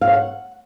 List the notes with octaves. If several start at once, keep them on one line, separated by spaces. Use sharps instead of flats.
F5
C#5
F#5